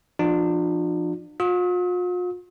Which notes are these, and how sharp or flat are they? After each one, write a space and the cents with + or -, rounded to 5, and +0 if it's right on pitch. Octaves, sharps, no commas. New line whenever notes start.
F3 -25 D4 +40 F4 +35
F4 +45 D#6 +45